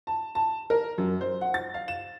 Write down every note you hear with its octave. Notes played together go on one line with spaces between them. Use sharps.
A5
A5
A#4
F#2
C5
F#5
A6
F5
E7